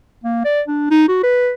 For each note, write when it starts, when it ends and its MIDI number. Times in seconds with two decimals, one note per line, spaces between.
0.24 0.41 58
0.45 0.62 74
0.68 0.89 62
0.91 1.08 63
1.08 1.23 66
1.24 1.52 71